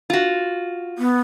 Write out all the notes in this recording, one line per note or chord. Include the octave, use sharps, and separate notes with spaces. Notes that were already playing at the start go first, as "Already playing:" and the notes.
F4 F#4
B3